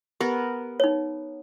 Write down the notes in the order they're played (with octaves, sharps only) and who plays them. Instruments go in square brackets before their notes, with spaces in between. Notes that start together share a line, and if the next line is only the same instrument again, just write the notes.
[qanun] B3 A#4 [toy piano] G4
[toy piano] D#4 C#5